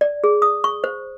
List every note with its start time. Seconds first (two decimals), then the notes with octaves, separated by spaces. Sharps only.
0.01 D5
0.24 G#4
0.42 D#6
0.64 C#6
0.84 C5